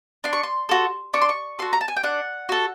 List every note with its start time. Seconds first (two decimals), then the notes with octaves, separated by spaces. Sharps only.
0.24 D4 C6
0.33 C#6
0.43 C6
0.69 F#4 A4
1.14 D4 C#6
1.22 C6
1.29 C#6
1.59 F#4 A4 C6
1.73 A#5
1.81 A5
1.88 G#5
1.97 G5
2.03 D4 F#5
2.49 F#4 A4